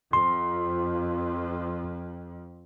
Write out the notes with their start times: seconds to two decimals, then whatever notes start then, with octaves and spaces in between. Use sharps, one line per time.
0.13 F2 C6